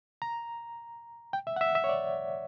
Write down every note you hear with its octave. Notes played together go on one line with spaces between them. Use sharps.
A#5
G5
E5
F#5
E5
E5
C#5
D5